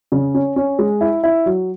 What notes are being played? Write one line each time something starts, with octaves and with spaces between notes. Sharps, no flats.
C#3
C#4
C#4
G#3
E4
E4
F#3